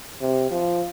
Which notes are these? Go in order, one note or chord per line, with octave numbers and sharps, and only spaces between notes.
C3
F3